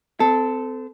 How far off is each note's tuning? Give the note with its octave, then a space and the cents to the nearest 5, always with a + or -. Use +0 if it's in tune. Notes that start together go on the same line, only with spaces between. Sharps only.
C4 -30 A4 +0